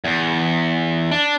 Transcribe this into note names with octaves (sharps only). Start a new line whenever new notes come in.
E2
D4